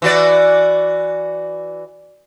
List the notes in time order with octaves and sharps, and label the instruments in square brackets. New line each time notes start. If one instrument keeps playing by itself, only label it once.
[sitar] E3 F#4 D5